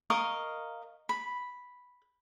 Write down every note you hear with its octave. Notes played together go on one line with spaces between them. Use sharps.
A#4 D#5 F5 C#6
B5